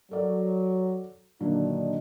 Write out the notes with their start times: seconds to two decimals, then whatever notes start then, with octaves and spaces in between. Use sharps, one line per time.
0.11 F#3 A4 A#4 D5
1.40 A#2 D3 D#3 F#3 D4 D#4